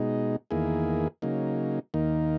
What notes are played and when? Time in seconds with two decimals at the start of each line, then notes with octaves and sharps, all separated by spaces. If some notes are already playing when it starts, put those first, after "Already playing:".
Already playing: B2 G#3 D#4
0.51 E2 D#3 A#3 E4 G#4
1.22 C#3 F#3 A#3 D#4
1.94 D#2 D#3 A#3 D#4